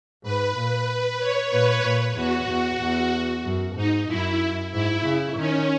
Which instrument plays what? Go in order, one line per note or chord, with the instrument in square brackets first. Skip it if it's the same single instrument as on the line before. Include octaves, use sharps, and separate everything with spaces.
[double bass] G#2 [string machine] B4
[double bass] A#2 [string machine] B4
[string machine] C#5
[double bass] A#2 [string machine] B4
[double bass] A#2
[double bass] E2 [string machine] F#4
[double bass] E2 [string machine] F#4
[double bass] E2
F#2
[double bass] G#2 [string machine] D#4
[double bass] F#2 [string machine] E4
[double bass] G#2 [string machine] E4
[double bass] C#3
[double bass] D#3 [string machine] C#4